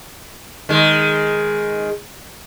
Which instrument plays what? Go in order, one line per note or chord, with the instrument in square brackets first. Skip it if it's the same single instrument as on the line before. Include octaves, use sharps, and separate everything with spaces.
[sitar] D#3 G#3